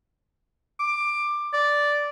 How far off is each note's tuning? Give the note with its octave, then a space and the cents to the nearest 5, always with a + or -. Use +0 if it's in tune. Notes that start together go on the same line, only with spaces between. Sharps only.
D6 +15
D5 -5